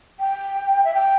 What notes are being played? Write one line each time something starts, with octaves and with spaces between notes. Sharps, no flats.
G5
E5
G5